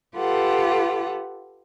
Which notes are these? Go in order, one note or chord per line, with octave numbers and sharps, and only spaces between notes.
F4 G4 A4 B4 F#5